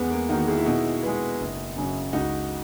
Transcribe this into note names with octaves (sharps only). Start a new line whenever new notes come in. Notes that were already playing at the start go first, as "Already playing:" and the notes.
Already playing: E2 G#3 B3
A#3
D#3 A#3 D#4 F#4
E4 G#4
E4
B2 D#4 F#4
G#3 B3
F#1
F#2 C#3 F#3
C#2 D#4 F#4